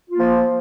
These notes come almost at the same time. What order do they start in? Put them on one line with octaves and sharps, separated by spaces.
F4 A#3 F3